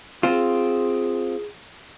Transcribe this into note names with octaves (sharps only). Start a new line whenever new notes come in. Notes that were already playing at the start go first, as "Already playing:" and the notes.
C4 F4 G#4